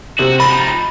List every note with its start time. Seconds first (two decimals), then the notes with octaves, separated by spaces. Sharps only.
0.19 C3 C4 F#4
0.40 F3 D#4 B5 A6